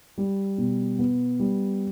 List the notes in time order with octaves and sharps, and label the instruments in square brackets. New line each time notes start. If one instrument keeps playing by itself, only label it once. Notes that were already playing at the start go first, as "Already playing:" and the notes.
[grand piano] G3
B2
B3
G3